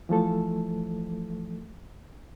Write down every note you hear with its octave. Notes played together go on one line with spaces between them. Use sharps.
E3 F3 A3 A4